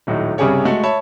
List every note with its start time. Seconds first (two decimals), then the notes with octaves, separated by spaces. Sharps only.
0.07 D#1 A2 F#3 D#4
0.38 C2 G2 C#3 G4 G#4 C#5
0.65 G#3 A3 F#4
0.84 C#5 E5 A5 B5